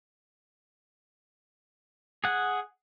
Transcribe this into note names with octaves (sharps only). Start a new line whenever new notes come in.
G#4 F#5